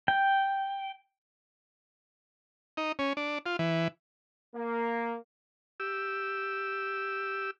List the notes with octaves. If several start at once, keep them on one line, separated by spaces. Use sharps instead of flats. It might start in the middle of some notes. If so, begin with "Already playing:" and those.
G5
D#4
C#4
D4
F4
E3
A#3
G4 E6